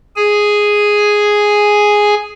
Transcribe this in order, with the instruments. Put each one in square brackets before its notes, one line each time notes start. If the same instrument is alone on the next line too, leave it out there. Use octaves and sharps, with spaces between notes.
[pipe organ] G#4 G#5